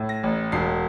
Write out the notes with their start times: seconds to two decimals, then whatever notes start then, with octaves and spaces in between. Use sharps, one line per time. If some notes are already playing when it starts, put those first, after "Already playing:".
Already playing: A2
0.09 A#6
0.23 A1
0.52 E1 C7